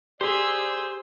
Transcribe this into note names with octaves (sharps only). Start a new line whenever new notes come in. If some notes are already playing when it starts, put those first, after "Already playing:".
G4 G#4 C5 D5 E6